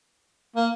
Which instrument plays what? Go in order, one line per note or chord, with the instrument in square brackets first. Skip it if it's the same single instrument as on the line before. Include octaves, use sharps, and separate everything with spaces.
[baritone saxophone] A#3